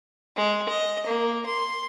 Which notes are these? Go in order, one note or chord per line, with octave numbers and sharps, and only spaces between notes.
G#3
D#5
A#3
C6